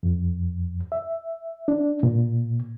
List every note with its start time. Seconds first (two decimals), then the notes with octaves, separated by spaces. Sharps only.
0.03 F2
0.92 E5
1.68 D4
2.03 A#2